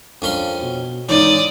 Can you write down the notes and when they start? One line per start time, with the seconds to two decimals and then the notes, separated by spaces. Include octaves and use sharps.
0.22 F2 C#4 D4 A#4 F5 C6
0.62 B2
1.09 G#1 C#3 E3 D#4 D5 D#6